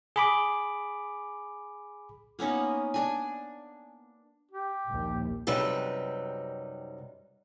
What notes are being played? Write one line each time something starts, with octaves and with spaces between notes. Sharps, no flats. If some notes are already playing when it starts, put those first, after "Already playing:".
G#4 B5 D6
A#3 B3 C#4 D#4
D4 G#5
G4
A#1 D#2
F#2 C3 G3 D#4 B4